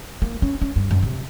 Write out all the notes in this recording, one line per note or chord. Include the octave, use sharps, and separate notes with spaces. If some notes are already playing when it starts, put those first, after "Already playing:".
A#3
C#4
C#4
G2
F#2
C3